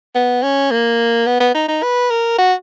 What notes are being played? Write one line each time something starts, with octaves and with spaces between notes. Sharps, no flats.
B3
C#4
A#3
B3
B3
D#4
D#4
B4
A#4
F#4